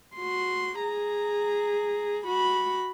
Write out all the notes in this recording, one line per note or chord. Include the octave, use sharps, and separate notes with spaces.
F#4 C6
G#4 A#5
F#4 B5